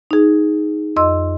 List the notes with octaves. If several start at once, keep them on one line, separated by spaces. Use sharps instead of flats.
D#4 G#4
F2 D#5 C6 E6